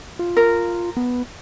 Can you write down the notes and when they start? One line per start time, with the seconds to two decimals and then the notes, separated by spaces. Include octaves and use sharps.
0.19 F4
0.37 A#4
0.97 B3